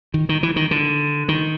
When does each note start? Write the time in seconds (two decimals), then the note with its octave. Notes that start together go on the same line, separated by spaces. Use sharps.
0.14 D#3
0.29 D#3
0.43 E3
0.56 D#3
0.71 D3
1.29 D#3